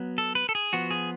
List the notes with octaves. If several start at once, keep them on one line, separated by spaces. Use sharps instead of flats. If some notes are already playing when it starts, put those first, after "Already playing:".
Already playing: F#3 B3
A4
B4
A4
G#4
F3 B3 F#4
G#4